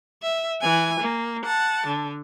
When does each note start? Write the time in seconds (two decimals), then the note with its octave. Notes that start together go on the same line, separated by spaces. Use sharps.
0.22 E5
0.61 E3 G#5
1.00 A#3
1.46 F#5 A5
1.87 D3